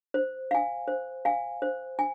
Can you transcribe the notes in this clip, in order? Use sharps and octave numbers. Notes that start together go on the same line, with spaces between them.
C5
F5 G#5
C5
F5 G#5
C5
G#5